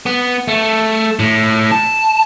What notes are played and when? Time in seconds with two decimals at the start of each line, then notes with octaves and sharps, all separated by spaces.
0.06 B3
0.48 A3
1.19 A2
1.72 A5